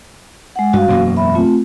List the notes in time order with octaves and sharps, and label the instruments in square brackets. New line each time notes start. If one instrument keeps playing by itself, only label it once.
[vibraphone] G#3 F#5
[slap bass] G2 [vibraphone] F#4 F5
[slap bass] E1 F#2 A#3
[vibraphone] E5 B5
A3 C4 F4